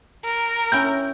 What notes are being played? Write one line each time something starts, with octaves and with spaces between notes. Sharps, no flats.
A#4
C#4 E4 G5 G6